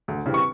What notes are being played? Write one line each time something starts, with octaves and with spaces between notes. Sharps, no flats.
D2
C#3 E3 G3 C4
C#6